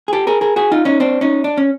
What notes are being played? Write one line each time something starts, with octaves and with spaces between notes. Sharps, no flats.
G#4
G4 A4
G#4 A#4
G#4 A#4
F#4 G#4
D#4 F4
C#4 D#4
C4 D4
C#4 D#4
D4
C#4